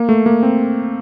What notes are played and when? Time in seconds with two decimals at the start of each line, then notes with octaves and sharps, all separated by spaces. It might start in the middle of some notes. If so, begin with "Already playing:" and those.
Already playing: A#3
0.09 A3
0.26 A#3
0.43 C4